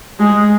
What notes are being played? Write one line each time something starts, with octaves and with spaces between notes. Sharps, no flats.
G#3